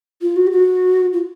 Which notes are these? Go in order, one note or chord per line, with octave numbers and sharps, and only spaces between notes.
F4
F#4
G4
F#4
F4